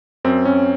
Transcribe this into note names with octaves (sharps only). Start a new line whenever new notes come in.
F#2 C4
F#2 C#4